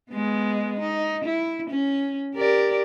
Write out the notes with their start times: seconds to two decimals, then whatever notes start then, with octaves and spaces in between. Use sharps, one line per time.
0.11 G#3 B3
0.80 D#4
1.24 E4
1.70 C#4
2.35 G4 A#4 D5